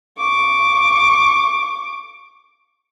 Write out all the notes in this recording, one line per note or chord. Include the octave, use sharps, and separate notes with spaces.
C#6 D6